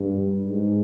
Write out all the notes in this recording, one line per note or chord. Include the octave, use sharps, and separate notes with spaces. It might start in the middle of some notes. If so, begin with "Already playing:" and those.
Already playing: G2
G#2